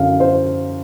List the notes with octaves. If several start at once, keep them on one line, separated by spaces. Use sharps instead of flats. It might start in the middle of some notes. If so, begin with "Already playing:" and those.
Already playing: F#2 D3 F5
C5